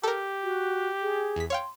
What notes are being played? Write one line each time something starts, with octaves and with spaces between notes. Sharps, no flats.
G4 A4 A#4
F#4
G#4
E2 B6
C#5 F5 G5 C6